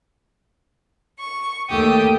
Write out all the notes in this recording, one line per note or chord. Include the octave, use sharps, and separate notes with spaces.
C#6
D#2 A3 G4 D#6